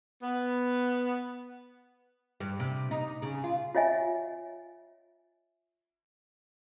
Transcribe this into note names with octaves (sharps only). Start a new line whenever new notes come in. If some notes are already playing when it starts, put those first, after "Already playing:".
B3
G2
C3
D#4
C#3
F4
F4 C#5 D#5 E5 G#5